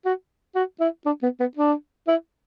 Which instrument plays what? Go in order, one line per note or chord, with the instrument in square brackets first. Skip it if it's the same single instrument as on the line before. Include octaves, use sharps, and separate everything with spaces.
[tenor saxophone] F#4
F#4
E4
D4
B3
B3
D4
E4